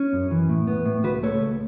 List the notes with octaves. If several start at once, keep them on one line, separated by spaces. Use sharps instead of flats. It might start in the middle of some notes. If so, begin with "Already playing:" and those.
Already playing: C#4
F#2
E3
A2
B3
A2
C#2 F#4 B4
A3 A4 C#5
C#2